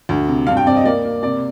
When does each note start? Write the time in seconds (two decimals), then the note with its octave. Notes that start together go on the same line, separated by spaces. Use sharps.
0.09 D2
0.28 C3
0.47 G2 F5
0.57 G5
0.66 C4 D5
0.76 D#5
0.85 A#3 D5
1.05 A#3
1.23 C3 D5